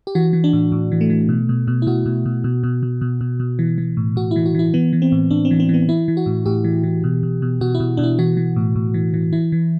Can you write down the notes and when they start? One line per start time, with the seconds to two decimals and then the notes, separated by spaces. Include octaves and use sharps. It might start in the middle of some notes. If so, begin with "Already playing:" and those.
0.07 G4
0.15 E3 F#4
0.33 E3
0.44 D4
0.53 A2
0.72 A2
0.92 E3
1.01 A3
1.10 E3
1.29 B2
1.49 B2
1.68 B2
1.82 E4
1.87 B2 F#4
2.06 B2
2.26 B2
2.44 B2
2.64 B2
2.83 B2
3.01 B2
3.21 B2
3.40 B2
3.59 E3
3.78 E3
3.97 A2
4.16 A2 F#4
4.31 E3 E4
4.46 F#4
4.55 E3 E4
4.74 E3 B3
4.93 E3
5.02 C4
5.12 A2
5.31 A2 D4
5.45 C4
5.51 E3
5.60 C4
5.69 E3 B3
5.89 E3 E4
6.08 E3
6.17 F#4
6.26 A2
6.46 A2 G4
6.64 E3
6.84 E3
7.04 B2
7.23 B2
7.42 B2
7.61 B2 F#4
7.75 E4
7.80 B2
7.97 B2 D4
8.04 E4
8.19 E3 F#4
8.37 E3
8.56 A2
8.76 A2
8.94 E3
9.14 E3
9.33 E3 E4
9.52 E3